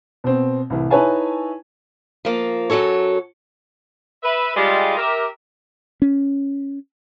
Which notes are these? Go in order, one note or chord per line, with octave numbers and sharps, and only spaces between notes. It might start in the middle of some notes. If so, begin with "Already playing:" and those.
B2 C4
C2 A2 E3
D#4 E4 B4 C#5 G#5 A5
F3 A#3
F#2 D#3 F#3 A4 C#5
B4 E5
G3 G#3 F4
G4 A#4 E5
C#4